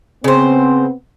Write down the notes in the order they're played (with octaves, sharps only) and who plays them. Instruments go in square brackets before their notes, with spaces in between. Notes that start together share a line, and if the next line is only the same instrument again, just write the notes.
[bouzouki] C#3 C5 [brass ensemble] B3 C4